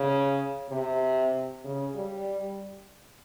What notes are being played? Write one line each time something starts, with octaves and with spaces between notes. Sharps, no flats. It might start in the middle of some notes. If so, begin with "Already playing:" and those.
Already playing: C#3
C3
C#3
G3